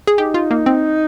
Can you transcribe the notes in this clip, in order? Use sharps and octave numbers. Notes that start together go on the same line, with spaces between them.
G#4
D#4 G4
F4
A#3
C4